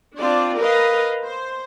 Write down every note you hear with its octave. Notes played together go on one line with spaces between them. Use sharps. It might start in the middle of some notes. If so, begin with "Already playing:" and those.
C4 D4 F4 D5
A#4 B4 D#5 F5
C5